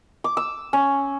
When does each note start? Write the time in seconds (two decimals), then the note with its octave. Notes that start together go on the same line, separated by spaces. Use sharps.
0.24 D6
0.37 E6
0.73 C#4